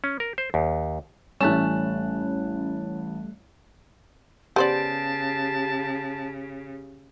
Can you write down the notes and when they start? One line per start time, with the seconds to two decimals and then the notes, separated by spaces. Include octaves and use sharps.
0.04 C#4
0.20 A#4
0.38 C5
0.54 D#2
1.40 A1 G3 A3 C#4 A5 F#6 E7
4.56 C#3 B3 G4 C5 D5 A5